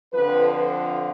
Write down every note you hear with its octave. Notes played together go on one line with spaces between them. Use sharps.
F2 D3 F3 B4